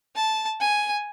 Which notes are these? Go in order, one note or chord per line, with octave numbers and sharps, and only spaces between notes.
A5
G#5